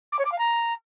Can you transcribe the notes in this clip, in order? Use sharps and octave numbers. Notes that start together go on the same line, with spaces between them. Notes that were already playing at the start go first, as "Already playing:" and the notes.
D6
C#5
D6
F5
A#5